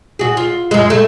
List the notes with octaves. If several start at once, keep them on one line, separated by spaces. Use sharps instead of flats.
F#4 G#4
F4
F#2 G#3
A3